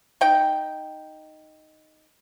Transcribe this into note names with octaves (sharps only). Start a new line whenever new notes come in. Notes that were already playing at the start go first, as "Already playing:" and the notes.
D#4 G5